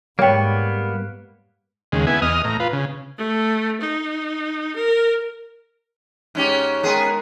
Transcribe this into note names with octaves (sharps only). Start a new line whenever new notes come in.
G#2 G3 A#3 B3 C#5 F#5 G5 C#6
D#2 C#3 G#3
B3 E4 G#5
E2 D#5 D#6 F6
A2 A#5
F4 B4
C#3
A3
D#4
A#4
G#2 C#4 G4
D#3 G#3 B3 G#4